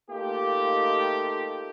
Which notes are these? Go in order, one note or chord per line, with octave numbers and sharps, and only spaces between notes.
A3 A#3 D#4 F4 G4